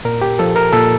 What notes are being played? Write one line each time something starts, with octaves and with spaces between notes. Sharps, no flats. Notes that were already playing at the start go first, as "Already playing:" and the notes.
A#2 A#4
G4
F3 A4
A#4
A#2 A4